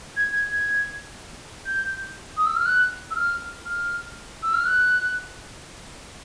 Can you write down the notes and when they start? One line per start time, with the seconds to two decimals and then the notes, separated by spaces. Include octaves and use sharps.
0.17 G#6
0.33 G#6
0.51 G#6
1.66 G6
2.37 D#6
2.46 E6
2.56 F6
2.66 F#6
3.11 E6
3.16 F6
3.66 F6
4.43 E6
4.54 F6
4.65 F#6